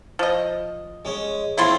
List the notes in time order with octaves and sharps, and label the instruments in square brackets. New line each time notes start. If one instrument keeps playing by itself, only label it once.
[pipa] F3 D#5
[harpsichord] G#3 C#4
[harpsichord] A3 C4 C#4 [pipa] E4 F4 C6